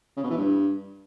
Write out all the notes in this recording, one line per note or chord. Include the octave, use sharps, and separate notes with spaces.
C#3
B2
E3
G2